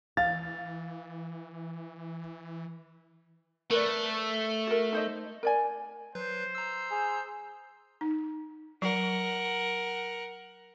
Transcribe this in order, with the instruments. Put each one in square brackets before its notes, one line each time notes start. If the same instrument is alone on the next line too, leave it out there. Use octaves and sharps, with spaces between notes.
[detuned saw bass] E3 [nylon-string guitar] F5 [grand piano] A6
[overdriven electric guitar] A3 [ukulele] A#4 B4 D5
[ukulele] F#4 A#4
D#4 C5 D#5
A#4 D5 G#5
[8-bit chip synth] F#3 B4 G6 [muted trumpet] C5
[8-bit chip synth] A#5 E6
[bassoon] G#4
[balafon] D#4
[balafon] F#3 [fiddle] A#4 F#5